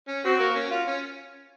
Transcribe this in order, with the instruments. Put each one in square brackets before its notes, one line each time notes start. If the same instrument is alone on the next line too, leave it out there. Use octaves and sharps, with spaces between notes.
[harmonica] C#4
[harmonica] C4 [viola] F#4
[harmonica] A#3
C#4
F4
C#4